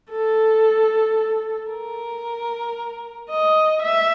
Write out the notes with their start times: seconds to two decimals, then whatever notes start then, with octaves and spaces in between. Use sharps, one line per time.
0.11 A4
1.70 A#4
3.31 D#5
3.83 E5